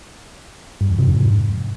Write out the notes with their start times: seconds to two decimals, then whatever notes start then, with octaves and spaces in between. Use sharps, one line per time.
0.81 G2
0.90 E2
0.99 C3
1.08 F2
1.16 G#2